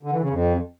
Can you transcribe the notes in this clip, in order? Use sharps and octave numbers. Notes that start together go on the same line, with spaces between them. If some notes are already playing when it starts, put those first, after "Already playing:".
D3
E3
C#3
F2